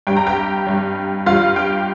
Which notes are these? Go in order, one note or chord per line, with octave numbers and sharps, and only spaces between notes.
G2 G3 G5
A#5
G4 G5
G2 G3
G2 G3 F4 F5
G4 G5